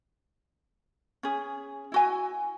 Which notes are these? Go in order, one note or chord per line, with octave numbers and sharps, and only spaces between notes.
C#4 G#4
E4 F#4 G#5